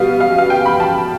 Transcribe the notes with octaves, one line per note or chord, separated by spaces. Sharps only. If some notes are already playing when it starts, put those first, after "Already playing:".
Already playing: B2 G3 B3 F5
F5
F5
G5
B5
A5